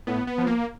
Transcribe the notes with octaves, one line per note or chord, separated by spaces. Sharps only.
A2 B3
B3
F3
A#3